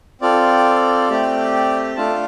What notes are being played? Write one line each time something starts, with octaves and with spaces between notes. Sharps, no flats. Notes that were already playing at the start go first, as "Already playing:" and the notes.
C4 F4 A4 D5
A3 C4 G4
A3 D4 F4 A4 A5